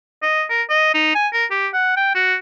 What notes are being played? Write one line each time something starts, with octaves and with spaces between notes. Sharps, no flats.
D#5
A#4
D#5
D#4
G#5
A#4
G4
F#5
G5
F#4